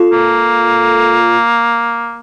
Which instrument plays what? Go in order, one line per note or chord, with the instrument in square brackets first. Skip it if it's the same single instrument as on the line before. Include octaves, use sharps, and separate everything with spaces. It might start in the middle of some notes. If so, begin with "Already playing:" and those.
Already playing: [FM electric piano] F4 A4
[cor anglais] A#3